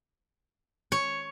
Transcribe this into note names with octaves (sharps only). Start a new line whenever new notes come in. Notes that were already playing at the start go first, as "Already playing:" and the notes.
C#5